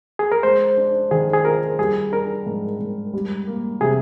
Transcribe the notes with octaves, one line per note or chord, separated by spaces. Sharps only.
G#4
A#4
G#3 C5
D4
D#3 G#4
G#4
F4 A#4
G3 G#4
D4 A#4
G#2
G#2
G3
A#3
C3 G#4